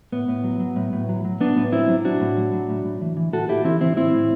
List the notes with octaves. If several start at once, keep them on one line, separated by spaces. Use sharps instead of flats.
A2 B3
A2
F#3
F#3
A2
A2
F#3
F#3
A2 B3 D4
A2
F#3 C4 E4
F#3
A2 D4 F#4
A2
F#3
F#3
A2
A2
E3
E3
A2 F#4 A4
A2 E4 G4
E3 C4 E4
E3 C4 E4
A2 C4 E4
A2